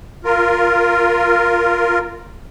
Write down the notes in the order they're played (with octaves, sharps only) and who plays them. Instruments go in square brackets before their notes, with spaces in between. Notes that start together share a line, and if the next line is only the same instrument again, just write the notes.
[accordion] F4 A#4